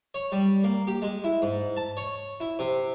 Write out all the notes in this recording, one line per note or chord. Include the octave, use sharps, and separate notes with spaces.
C#5
G3
A#3
G4
G#3
E4
G#2
A5
C#5
E4
C3